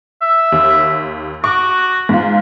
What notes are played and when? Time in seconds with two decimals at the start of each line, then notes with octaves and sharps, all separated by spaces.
0.22 E5
0.52 D#2
1.44 F#4 C#6 D6
2.09 G#2 F4